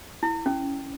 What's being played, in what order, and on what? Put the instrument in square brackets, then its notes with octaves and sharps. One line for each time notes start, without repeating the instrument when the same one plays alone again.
[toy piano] E4
C#4